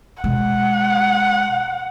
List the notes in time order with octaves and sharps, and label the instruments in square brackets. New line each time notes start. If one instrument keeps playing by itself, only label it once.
[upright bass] B2 G#3 [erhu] F#5